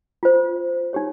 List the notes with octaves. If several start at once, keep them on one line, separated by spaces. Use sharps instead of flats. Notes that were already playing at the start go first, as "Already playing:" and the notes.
F4 C5
D#4 G4 C#5